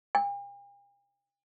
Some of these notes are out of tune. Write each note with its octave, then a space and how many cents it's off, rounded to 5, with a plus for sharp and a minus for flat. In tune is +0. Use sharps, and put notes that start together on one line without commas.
G5 +45